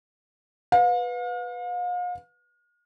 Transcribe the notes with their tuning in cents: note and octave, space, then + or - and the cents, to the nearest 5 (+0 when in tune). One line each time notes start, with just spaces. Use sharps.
B4 +0 F5 +40